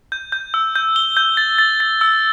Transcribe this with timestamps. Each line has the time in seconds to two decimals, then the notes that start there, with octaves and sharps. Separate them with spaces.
0.12 G6
0.32 G6
0.54 E6
0.76 G6
0.96 G7
1.17 G6
1.37 A6
1.59 A6
1.80 A6
2.01 E6